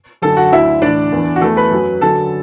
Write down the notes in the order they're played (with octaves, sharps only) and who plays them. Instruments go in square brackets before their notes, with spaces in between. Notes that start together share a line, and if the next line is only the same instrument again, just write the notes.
[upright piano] F#2 D3 F#3 A4 A5
F#4 F#5
D2 D3 F#3 E4 E5
A2 E3 D4 D5
E2 E3
F#4
E2 E3 A3 A4
B4 B5
F#2 F#3
F#2 D3 F#3 A4 A5